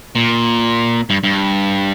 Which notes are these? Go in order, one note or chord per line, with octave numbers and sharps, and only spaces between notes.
A#2
G2
G2